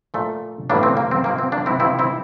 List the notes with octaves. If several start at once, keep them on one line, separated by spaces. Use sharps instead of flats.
A#2 F3 A3
A2 E3 G3 A#3 D4
C4
A#3
C4
C3 F3 A#3
C4
A#3 D4
C4 E4
C3 F3 A#3 C4 E4
C4 E4